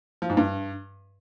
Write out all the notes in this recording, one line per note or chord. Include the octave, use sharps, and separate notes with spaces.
F3
G#2
G2